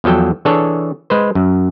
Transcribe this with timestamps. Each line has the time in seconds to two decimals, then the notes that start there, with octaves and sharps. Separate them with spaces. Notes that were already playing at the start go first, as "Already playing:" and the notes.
0.04 E2 F3 F#3 A4 G5
0.45 E3 D4 G#4 A4 C#5
1.10 G#3 B4 C5
1.35 F#2